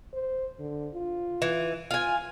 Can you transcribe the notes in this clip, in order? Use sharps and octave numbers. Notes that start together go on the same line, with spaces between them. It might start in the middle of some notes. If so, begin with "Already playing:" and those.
C5
D3
F4
E3
F4 G#5